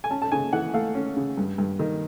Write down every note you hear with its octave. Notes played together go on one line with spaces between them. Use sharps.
G#5
C#4 A5
A5
C#3 G#5
E3 F#5
A3 F5
C#4
C#3
G2
G2
D#3